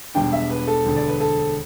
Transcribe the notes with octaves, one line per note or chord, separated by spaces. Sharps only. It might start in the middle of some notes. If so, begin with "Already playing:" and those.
E1 E2 B2 G3 D4 G5
E5
B4
A4
E1 D2 D3
D5
B4
A4